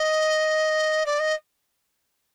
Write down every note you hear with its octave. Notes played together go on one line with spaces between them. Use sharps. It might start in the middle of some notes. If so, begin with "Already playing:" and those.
Already playing: D#5
D5
D#5